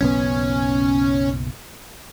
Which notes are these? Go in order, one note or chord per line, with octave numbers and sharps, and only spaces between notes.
F#1 B1 B3 C#4